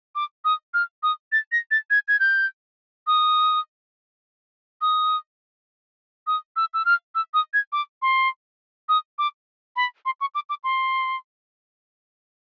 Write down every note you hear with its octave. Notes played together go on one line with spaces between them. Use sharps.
D6
D#6
F6
D#6
A6
A#6
A6
G#6
G#6
G6
D#6
D#6
D#6
E6
E6
F6
E6
D#6
G#6
D6
C6
D#6
D6
B5
C6
C#6
D6
D6
C6